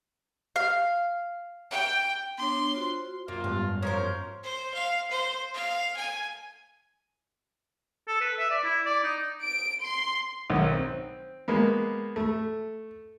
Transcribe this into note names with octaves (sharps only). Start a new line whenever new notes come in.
F5
G5
B3 D4 C#5 C6
F4 F#4 C5
F#2 A#3 F4
G#2 G3 B3 A5
F3 A#4 C5 C#5
C5
F5
C5
F5
G#5
A4
B4
E5
D5
E4
D5
D#4
D7
C6
B1 D#3 C#5
C4
G#3 A#3 B3
A3